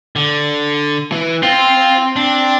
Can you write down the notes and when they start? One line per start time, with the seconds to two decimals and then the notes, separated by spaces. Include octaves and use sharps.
0.16 D3
1.12 E3
1.43 C4 F4
2.16 D4